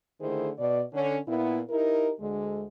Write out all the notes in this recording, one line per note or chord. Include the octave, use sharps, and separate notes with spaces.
D3 D#3 A3 E4 G#4 C5
B2 D5
D3 C#4
A#2 B3 E4
D#4 E4 G4 A#4
D2 D3 G#3